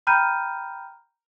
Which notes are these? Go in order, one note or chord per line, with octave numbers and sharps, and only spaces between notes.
G5 A#5 B5 F6 G6 D#7